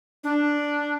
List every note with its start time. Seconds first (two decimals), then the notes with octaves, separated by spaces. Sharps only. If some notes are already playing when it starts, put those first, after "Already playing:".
0.24 D4